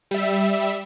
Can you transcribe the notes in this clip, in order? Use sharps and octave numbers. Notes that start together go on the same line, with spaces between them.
G3 E5